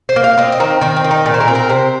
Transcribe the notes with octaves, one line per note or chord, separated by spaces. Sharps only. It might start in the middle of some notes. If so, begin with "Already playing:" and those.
C5
A#3
F5
C4 D#5
D#5
D#3 C5
D#3 C4
C4
D#3
D#4
A#2
C5
A#4
C4
A#4
C3 C5